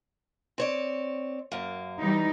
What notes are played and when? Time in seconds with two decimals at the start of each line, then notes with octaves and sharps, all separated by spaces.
0.58 C4 C#5 D5
1.52 F#2 A#3
2.00 E3 G3 D#4